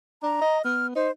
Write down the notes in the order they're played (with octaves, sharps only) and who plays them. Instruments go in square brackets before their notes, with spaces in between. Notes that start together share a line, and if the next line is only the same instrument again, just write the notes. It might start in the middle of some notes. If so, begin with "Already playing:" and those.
[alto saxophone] D4 [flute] A#5
[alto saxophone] D#5
[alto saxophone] B3 [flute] F6
[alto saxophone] D#4 [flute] C5